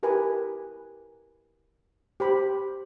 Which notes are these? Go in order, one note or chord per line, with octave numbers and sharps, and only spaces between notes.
E4 G4 A#4 B4 G#5
G4 C5 B5